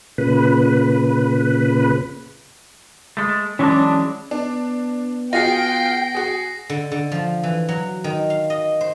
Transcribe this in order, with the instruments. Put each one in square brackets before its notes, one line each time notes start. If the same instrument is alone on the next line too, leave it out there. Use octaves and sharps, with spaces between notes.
[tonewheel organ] A#2 C#3 B4
[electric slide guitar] G#3 A3
[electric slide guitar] E3 F#3 G#3 [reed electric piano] C#4 [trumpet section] D4
[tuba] B3 [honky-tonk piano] D4
[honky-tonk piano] F4 F#4 G#4 [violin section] G5 [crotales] A#6 C7
[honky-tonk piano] F#4 G#4
[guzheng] D3
D3
F3
E3
F#3
D#3
F5
D#5
C5